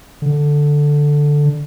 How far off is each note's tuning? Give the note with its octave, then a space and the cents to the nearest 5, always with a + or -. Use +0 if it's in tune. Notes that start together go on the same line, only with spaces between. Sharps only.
D3 +0